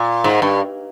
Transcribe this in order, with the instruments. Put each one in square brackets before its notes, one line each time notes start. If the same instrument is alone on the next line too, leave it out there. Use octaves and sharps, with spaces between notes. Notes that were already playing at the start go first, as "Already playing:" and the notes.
Already playing: [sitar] A#2
G#2
G2